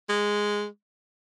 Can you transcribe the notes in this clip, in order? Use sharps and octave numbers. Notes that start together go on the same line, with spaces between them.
G#3